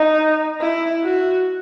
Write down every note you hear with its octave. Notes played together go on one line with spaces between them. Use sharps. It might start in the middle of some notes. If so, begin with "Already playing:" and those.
Already playing: D#4
E4
F#4